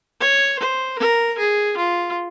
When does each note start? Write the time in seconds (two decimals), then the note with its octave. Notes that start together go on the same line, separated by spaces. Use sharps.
0.20 C#5
0.59 C5
0.99 A#4
1.38 G#4
1.77 F4